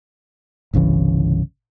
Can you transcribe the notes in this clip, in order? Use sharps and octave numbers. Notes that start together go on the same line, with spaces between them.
G1 C2 C#3 E3